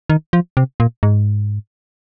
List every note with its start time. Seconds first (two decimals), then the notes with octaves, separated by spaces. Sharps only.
0.10 D#3
0.33 F3
0.57 C3
0.80 A#2
1.03 G#2